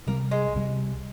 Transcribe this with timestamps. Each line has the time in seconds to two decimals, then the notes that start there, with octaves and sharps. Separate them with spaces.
0.07 C2 C3 G3 A#3
0.31 G#3
0.54 C2 C3 G3